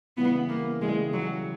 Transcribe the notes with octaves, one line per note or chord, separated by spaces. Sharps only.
C#3 E3 G3 B3
A#3
C#3 E3 G3 G#3
F#3